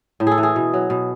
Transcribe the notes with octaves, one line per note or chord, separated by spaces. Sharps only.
A2
G#4 A4
E3
G#4
B2
F#3
B2